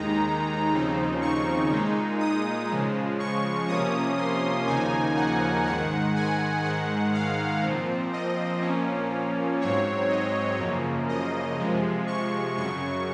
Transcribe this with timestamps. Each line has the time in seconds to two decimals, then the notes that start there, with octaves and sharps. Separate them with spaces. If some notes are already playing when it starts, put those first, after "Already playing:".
Already playing: D#2 D#3 G#3 D#4 A#5
0.73 D#2 C#3 F3 C4 D#4
1.22 C#6
1.72 A#2 G#3 D#4
2.20 D#6
2.69 C#3 F3 G#3
3.19 C#6
3.68 C3 F3 A#3 C#4 D#6
4.17 C6
4.67 D#2 C#3 F3 A#3 D#4 G#5
5.16 F#5
5.65 G#2 D#3 G#3 F#5
6.16 G#5
6.64 G#2 D#3 G#3 F#5
7.14 F5
7.63 A#2 F3 C4
8.13 D#5
8.61 A#2 F3 A#3 C#4
9.61 G#2 F#3 C4 C#5
10.09 D#5
10.59 F#2 C#3 F3 A#3
11.09 D#5
11.59 C3 F3 G#3
12.07 C#6
12.57 F#2 C#3 F#3 C#6